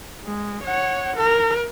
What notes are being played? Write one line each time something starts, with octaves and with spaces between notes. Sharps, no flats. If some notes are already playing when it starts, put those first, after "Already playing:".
G#3
C#5 F#5
A#4